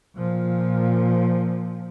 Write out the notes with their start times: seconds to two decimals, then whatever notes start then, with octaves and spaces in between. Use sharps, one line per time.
0.16 A#2 F3